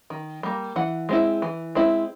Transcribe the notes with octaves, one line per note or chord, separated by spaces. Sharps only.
D#3
G3 A#3
E3 F#5
G#3 C4 E4
E3
G#3 C4 E4